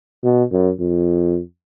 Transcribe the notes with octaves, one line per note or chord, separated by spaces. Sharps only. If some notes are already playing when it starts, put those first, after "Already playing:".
B2
F#2
F2